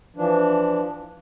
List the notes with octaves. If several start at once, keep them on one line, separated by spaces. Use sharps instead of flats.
E3 F3 D4